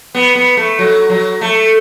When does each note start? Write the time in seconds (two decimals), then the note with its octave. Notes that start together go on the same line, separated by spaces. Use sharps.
0.15 B3
0.35 B3
0.57 A3
0.79 F#3
1.10 F#3
1.41 A3